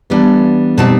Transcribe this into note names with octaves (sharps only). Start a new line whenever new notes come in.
E3 G3 B3 D4
B2 G3 C4 D#4 A5